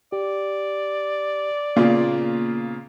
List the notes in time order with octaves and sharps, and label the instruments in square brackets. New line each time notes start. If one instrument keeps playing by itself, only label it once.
[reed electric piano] G4 [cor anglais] D5
[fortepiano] A#2 C#3 F4 [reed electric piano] A#3 B3